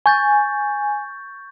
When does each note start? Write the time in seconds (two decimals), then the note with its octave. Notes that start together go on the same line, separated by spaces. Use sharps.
0.06 G#5 C#6 G6 A6